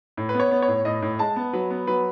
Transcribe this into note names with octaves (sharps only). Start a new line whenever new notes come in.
A2
B4
B3
C#5
B3
C#5
A2
A2 D#5
A2
G#3 A5
B3
F#3 B4
B3
F#3 B4